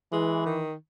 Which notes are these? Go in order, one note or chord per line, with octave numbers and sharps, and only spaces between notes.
E3 G#3
D#3